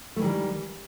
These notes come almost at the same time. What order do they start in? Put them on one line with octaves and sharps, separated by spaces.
A3 E3 D#3 G3